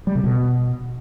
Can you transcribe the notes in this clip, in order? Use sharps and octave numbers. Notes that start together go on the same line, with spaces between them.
G3
C3
B2